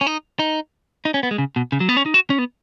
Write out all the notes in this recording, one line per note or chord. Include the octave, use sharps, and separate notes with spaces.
C#4
D#4
D#4
D#4
C#4
B3
G#3
C#3
B2
C#3
F#3
B3
C#4
D#4
F#4
C#4
B3